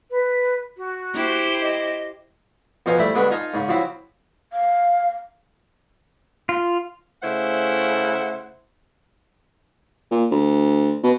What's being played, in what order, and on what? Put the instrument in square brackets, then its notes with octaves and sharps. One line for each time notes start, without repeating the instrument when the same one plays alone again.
[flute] B4
F#4
[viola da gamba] E4 G4 C5
[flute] D#5
[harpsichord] F2 B2 C#4 C5 F5 G#5
G3 A3 E4 C5 E5
G2 D3 G#3 B3 C#4 D4
D#4 F4 D#5 G#5 A5
G#2 C#3
F3 F#3 C4 E4
[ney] F5
[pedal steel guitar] F4
[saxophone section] C#3 A3 E4 C5 F#5
[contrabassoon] A#2
D2
B2